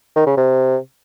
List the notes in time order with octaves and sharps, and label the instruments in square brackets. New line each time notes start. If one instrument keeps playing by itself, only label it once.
[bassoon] D#3
C#3
C3